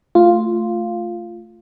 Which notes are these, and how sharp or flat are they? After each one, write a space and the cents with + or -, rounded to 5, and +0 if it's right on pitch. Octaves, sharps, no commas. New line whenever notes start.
A3 +0 F4 +0